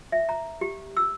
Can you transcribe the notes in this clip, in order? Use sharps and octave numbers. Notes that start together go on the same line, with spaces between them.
E5
A#5
G4
E6